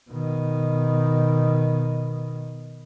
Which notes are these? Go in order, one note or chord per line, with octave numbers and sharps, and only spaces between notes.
B2 D#3